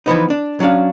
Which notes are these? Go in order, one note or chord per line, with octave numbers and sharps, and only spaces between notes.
E3 F3 B3 D#4
D4
F#3 C#4 D4 F5